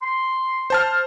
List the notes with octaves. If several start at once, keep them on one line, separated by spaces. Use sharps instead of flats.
C6
C5 A5 F6